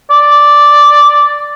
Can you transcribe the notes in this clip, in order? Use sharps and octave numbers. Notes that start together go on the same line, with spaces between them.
D5